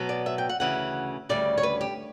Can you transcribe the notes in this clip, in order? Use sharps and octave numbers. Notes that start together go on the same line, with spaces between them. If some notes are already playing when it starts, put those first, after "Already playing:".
Already playing: B2 F#3 B3
D5
E5
G5
F#5
D2 C#3 E3 F#5
D2 C#3 G3 D5
C#5
B4
G4